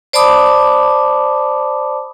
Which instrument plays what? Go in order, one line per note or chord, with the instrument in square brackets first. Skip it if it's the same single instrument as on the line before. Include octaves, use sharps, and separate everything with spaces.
[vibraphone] C5 D5 A5 B5 D6 D#6